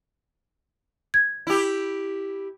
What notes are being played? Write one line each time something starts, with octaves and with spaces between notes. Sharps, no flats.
G#6
E4 G4